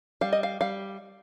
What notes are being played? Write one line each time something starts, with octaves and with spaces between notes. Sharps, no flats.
G3 F5
D#5
F5
G3 F5